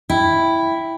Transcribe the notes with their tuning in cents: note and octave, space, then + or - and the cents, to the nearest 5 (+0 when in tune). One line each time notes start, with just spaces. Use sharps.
E4 +0 G5 +0